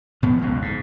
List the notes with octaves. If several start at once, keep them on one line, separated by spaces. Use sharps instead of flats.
G#2 B2 F3 B3
F#1 C#2 F#2
G#2